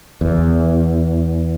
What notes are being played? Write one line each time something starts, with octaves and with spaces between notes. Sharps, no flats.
E2